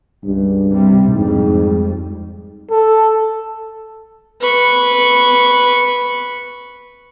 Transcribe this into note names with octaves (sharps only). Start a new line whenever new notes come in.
C#2 G2
C3 G3
F2 G#2 G3
A4
B4 C#6